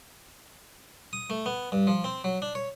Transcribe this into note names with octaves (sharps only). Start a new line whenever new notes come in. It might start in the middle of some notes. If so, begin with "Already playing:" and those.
D#6
A3
B3
G2
F3
C4
F#3
D4
C#5